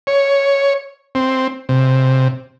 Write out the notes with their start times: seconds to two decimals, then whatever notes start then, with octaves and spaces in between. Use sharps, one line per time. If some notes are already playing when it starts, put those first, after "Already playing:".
0.07 C#5
1.15 C4
1.69 C3